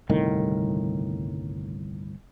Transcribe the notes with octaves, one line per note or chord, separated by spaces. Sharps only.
G1 C2 A2 D#3